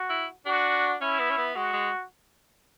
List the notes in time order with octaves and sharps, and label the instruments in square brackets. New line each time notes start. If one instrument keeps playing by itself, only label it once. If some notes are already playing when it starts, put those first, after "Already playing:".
Already playing: [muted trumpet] F#4
[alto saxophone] E4
[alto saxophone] D4 [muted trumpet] F#4
[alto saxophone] C#4 [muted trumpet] E4
[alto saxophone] B3
C#4
B3
[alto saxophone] G#3 [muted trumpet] F#4
[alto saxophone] G#3